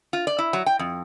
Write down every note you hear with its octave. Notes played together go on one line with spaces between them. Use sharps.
F4
D5
E4
F#3
G5
F2